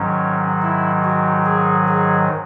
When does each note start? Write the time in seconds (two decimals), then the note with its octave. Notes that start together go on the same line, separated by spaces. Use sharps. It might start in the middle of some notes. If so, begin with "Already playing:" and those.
Already playing: G#2 D#3 F#3 C#4
0.62 E4
1.04 F#4
1.46 G#4
1.87 G#4